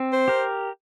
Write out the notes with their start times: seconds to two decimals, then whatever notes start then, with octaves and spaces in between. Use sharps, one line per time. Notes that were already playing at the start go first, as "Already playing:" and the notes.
Already playing: C4
0.13 C5
0.28 G4 A#4